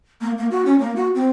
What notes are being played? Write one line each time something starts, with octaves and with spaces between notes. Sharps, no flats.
A#3
A#3
F#4
C#4
A#3
F#4
C4